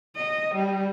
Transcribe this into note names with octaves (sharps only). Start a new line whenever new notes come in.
D#5
G3